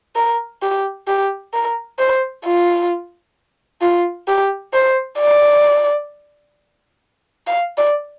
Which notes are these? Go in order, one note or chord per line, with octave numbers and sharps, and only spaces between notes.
A#4
G4
G4
A#4
C5
F4
F4
G4
C5
D5
F5
D5